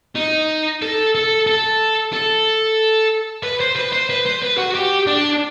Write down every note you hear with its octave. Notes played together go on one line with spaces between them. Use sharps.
D#4
A4
A4
A4
A4
B4
C5
B4
C5
B4
C5
B4
F#4
G4
D4